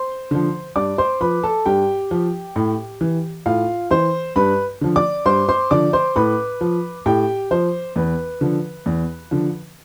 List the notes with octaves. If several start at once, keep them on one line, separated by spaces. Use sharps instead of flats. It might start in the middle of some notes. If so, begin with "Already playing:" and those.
Already playing: C5 C6
D3 F3
G2 D5 D6
C5 C6
F3 B4 B5
A4 A5
G2 G4 G5
F3
A2
E3
A2 F4 F5
E3 C5 C6
G2 B4 B5
D3 F3
D5 D6
G2 C5 C6
C5 C6
D3 F3 D5 D6
C5 C6
A2 B4 B5
F3
A2 G4 G5
F3 C5
E2 B4
D3 F3
E2
D3 F3